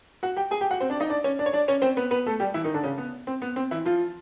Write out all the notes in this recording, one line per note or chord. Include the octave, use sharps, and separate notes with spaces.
F#4 F#5
G4 G5
G#4 G#5
G4 G5
F#4 F#5
C4 C5
D4 D5
D#4 D#5
D4 D5
C#4 C#5
D4 D5
C#5
D4 D5
C#4 C#5
C4 C5
B3 B4
B3 B4
A3 A4
G3 G4
E3 E4
D#3 D#4
D3 D4
C#3 C#4
B3
C4
B3
C4
E3 E4
F3 F4